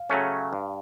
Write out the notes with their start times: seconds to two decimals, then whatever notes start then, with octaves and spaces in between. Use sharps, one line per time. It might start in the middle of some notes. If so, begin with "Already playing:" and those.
Already playing: F5
0.10 C#3 F#3 A3 C#4
0.53 G2